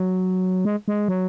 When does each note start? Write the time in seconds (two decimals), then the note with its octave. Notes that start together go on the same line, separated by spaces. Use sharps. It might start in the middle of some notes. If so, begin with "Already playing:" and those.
Already playing: F#3
0.65 G#3
0.88 G#3
1.08 F#3